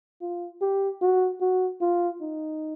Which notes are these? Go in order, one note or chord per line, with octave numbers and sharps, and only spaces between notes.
F4
G4
F#4
F#4
F4
D#4